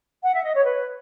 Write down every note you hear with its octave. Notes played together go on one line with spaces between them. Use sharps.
F#5
E5
D#5
C#5
B4